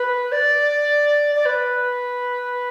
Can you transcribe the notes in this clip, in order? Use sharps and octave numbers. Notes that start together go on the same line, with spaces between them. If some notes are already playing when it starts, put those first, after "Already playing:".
Already playing: B4
D5
D5
B4